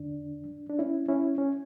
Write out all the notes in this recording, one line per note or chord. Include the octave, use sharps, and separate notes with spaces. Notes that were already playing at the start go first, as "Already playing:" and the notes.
Already playing: E2 D3 D4
D4
C#4 E4
C#4 E4
C#4